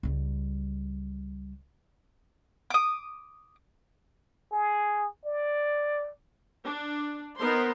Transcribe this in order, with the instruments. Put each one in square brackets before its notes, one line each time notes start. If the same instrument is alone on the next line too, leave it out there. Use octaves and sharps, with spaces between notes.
[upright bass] C#2 G3
[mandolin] D6 D#6
[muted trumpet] G#4
D5
[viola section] D4
B3 D#4 A#4 C5 C6